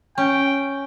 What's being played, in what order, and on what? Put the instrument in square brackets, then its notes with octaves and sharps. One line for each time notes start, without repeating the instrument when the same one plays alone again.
[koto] C#4 [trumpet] G5